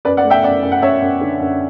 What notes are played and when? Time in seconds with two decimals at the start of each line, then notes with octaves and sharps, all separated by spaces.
0.05 F#2 B4 D5
0.17 D5 F#5
0.24 A3
0.30 E5 G5
0.43 F#2 D5 F#5
0.63 F#2
0.72 F#5
0.82 F#2 C#5 E5
1.01 F#2
1.21 D3
1.40 F#2